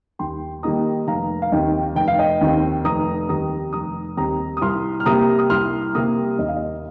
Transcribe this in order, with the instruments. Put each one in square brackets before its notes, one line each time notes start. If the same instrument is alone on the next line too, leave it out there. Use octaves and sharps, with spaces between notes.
[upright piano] D#2 G5 C6
D#3 G3 A#3 D#4 A#5 D#6
F1 F5 A#5
F5
D#2 D#3 C4 D#5 G5
F1 G5
F5
D#5 G5
D#2 D#3 C4
F1 A#5 D#6
D#2 D#3 G3 C4 A#5 D#6
F1 A#5 D#6
D#2 D#3 G3 C4 A#5 D#6
D#6
C2 C6 F6
F6
C3 G3 A#3 A#5 D#6
D#6
C2 C6 F6
C3 G3 A#3 A#5 D#6
D#2 D#5
F5
D#5